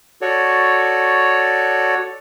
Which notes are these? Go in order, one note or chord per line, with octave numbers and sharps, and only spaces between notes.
F#4 A4 C#5 D5